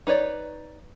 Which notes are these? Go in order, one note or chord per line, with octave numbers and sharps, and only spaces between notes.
D#4 B4 C#5 D5